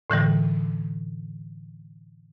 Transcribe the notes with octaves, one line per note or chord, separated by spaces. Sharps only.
A2 D3 E3 G3